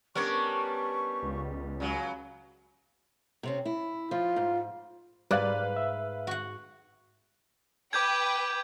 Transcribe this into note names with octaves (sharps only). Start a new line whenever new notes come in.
G3 B3 C#4 D4 A#4 C#6
C#2
C#3 F#3
C3 C4 C#4
E4
F3 F4
G#2
G#2 G3 B4 D5 F5 F#6
E5
F#4 F#5
B4 G5 D6 G6 G#6